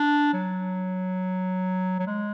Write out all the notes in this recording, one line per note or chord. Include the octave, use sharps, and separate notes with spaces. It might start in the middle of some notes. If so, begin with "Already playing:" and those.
Already playing: D4
F#3
F#3
G#3